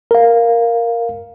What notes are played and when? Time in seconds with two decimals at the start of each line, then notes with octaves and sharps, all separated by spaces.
0.11 A#4 F5